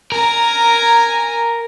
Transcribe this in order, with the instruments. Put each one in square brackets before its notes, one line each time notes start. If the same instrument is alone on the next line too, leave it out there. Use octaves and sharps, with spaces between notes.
[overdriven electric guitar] A#4 [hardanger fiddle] G#5 A#5